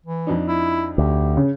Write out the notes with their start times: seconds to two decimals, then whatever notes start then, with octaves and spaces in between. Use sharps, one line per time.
0.06 E3
0.27 F2 D4 D#4
0.48 E4
0.98 D2 G4
1.37 C#3